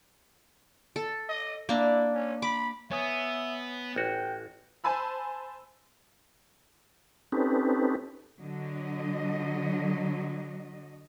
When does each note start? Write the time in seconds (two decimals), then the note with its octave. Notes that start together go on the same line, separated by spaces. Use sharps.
0.96 A4
1.29 D#5
1.69 A#3 D4 E4
2.13 C#4
2.42 B5 D6
2.91 B3 C#5 E5 G#5 D#6
3.96 A1 F#4 G5
4.84 C5 G#5 A5 B5 E6
7.32 C4 C#4 D#4 G4 A4 B4
8.40 D3 F#3 D#5